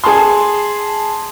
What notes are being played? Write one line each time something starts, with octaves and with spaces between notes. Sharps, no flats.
G#4 A5 C6